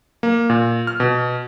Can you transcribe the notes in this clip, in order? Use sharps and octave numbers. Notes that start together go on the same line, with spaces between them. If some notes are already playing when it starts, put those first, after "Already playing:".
A#3
A#2
F6
B2